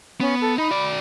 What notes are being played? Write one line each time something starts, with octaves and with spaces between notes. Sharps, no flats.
B3 C#4
A4
D#4 B5
F#4 D5